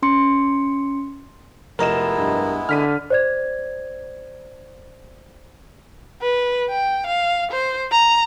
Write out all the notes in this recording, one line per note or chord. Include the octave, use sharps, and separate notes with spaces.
C#4 C6 C#7
F1 G#3 B3 E4 A#4 D#5 A#5 E7
G2
D3 F6 B6 D#7
C5 D5 G#6
B4
G5
F5
C5
A#5